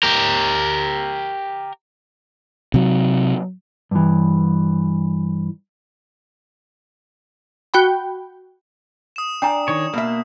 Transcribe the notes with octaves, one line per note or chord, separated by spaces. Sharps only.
G4 A#4
C3 F#3
G2 E3
F#4 G5 B5
D#6 E7
D4 G5 G#5 A#5
D#3 C#5
B2 A#3 E5